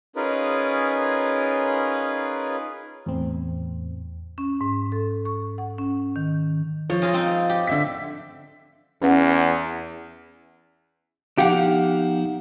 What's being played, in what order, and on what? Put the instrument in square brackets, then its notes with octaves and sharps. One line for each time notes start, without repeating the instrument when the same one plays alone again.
[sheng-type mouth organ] C#4 D#4 F4 G#4 A#4 B4
[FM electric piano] E2 A2 C4
[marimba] C#4
G#2
A4
C#6
F#5
C#4
D#3
[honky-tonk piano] F3 [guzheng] C#5
[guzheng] F4 G#4 A#4
C4 D#4
G4
[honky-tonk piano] D3 E5 B6
[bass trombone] E2 [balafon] C#4 B4 F#5
[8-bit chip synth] F3 B3 D#4 [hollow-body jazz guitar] G4 [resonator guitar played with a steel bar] F5 F#5